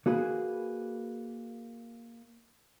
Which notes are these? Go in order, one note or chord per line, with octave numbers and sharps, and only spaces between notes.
A#3 F#4 G#4 B4